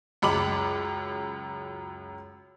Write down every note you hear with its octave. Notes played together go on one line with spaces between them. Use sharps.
C#2 F#2 B5 D6 F#7